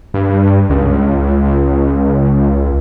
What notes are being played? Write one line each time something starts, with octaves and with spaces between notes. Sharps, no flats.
G2
C#2